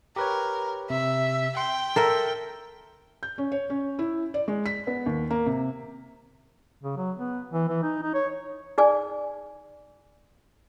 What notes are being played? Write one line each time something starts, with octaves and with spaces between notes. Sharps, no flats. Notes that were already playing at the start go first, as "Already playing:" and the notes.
G4 A#4 B4 C#5
C3 E5
G5 C6
A4 A#4 E5
G6
C#4
C#5
C#4
E4
D5
G#3
B6
B3
D#2
A#3
C3
C#3
F#3
B3
E3
E3
D#4
D#4
C#5
D#4 G#4 D5 G#5